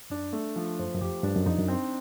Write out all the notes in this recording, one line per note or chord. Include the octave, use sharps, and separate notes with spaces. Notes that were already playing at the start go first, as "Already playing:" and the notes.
F#2 D4
A3
F3
F#2 C5
F#2
F2 G4
G2 D4
F#2
F2 D#4
F#2
C4